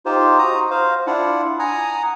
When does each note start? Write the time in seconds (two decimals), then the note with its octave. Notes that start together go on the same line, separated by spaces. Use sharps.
0.06 D#4 F4 G4 C5
0.38 F#4 A#5 D#6
0.71 C5 F5
1.07 D4 E4 F4 F#5
1.59 F#5 G#5 A#5 D#6